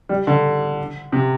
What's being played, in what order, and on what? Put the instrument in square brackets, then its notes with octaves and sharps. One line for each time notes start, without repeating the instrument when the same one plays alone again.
[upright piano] G3
D3
C3